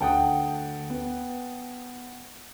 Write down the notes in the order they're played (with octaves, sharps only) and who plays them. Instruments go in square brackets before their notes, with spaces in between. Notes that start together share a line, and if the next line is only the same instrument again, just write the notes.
[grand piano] D2 D#6 [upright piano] F#5 G5 A5
[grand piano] B3